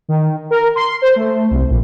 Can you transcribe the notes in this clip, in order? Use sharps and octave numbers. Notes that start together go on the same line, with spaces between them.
D#3
A#4
C6
C5
A3
C2
A#1